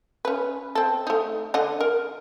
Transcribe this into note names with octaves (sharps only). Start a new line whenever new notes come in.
C#4 B4
C4 A4
A3 D#4
D3 D#5 F#5
A#4